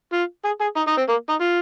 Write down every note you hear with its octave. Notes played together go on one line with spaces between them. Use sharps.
F4
G#4
G#4
D#4
D#4
C4
A#3
D#4
F4